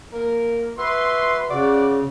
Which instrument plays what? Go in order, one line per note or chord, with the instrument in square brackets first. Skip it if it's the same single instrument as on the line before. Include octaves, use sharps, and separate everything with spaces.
[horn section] A#3 A#4
[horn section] F#4 E5 C6 [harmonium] B4
[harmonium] C#3 [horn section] F#4 D5